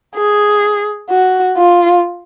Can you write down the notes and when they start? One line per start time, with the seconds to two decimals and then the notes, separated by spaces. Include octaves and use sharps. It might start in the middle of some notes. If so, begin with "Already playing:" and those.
0.16 G#4
1.10 F#4
1.57 F4